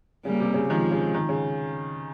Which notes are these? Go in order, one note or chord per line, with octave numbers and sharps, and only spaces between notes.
C#3 G3 A#3
C3
C#3
D#3 F3 G#3
C#3
D#3
C#3